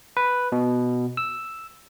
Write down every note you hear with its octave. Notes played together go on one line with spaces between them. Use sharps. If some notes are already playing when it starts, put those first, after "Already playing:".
B4
B2
E6